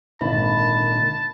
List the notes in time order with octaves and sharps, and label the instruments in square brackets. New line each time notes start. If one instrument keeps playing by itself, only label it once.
[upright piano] G#1 [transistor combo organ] A#2 D3 [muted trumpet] A5 [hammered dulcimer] B5